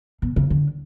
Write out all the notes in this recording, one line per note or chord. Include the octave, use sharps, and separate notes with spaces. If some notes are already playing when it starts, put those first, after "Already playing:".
B2
C#3
D3